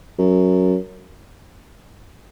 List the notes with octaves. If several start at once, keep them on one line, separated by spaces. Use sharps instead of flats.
F#2